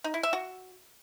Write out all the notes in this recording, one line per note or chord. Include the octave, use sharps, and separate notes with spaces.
D#4
E4
E5
F#4